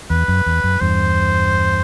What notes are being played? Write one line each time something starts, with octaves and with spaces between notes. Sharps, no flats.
E2 B4
F#2
E2
F#2
E2 G2 C5